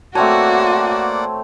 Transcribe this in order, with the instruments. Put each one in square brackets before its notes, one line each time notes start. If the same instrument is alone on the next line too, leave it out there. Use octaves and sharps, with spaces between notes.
[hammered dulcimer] A3 C4 C#5 [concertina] A#3 D5 F#5 [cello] F#4 [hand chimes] A5